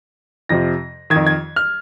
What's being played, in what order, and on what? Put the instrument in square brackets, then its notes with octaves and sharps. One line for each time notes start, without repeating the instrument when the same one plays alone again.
[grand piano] F2 C3 F3 A#6
D#3 G#6
F2
G#6
F6